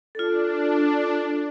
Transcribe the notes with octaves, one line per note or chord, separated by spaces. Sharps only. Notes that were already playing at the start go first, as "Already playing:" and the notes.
D4 F4 A4